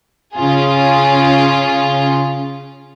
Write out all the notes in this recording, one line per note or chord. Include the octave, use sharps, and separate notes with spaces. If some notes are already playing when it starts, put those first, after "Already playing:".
C#3 F4 G#4